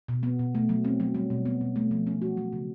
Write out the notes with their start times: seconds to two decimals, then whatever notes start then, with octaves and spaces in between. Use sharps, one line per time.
0.08 B2
0.23 B3
0.39 B2
0.55 A3
0.69 F#3
0.85 C4
1.00 F#3
1.15 G3
1.30 B2
1.46 B3
1.61 B2
1.76 A3
1.91 F3
2.07 C#4
2.22 F#4
2.37 F#3
2.53 C#3